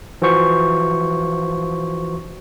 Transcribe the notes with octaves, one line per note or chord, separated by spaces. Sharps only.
E3 F3 F#4 C5 C#6